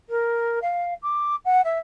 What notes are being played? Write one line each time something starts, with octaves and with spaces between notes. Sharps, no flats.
A#4
F5
D6
F#5
E5